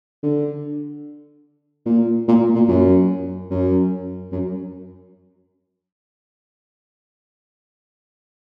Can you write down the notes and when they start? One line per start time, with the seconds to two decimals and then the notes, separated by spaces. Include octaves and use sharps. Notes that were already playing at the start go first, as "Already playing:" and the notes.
0.23 D3
1.86 A#2
2.28 A#2
2.55 A#2
2.68 F#2
3.51 F#2
4.32 F#2